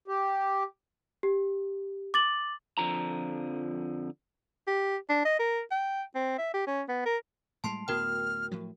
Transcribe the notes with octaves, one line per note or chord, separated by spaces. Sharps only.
G4
G4
D6 A6 F#7
F2 D3 F3 A#5
G4
D4
D#5
A#4
G5
C4
E5
G4
C#4
B3
A#4
A2 G3 G#3 A5 C6 C7
D1 A2 B3 F#4 A#4 G5 F6
A2 F3 F#3